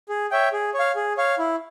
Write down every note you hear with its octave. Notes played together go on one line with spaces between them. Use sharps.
G#4
C#5 E5 G5
G#4
C#5
F5
G#4
C#5 F5
E4